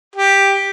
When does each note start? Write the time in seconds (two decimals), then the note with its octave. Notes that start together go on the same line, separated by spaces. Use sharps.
0.15 G4